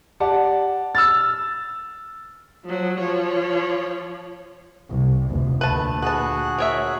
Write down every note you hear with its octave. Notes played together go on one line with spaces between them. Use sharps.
G4 D5 F#5 A5
E6 F6 A6
F3 F#3
F3 C#5
C2
F1 D2
D2 A#2 A3 B4 A5
F#4 G#4 B4 A5 F#6
A#4 C#5 E5